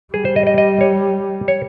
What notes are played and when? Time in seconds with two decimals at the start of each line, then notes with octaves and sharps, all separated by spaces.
0.14 G3 G#4
0.25 C5
0.36 D#5
0.47 D#5
0.58 D#5
0.81 C#5
1.48 C#5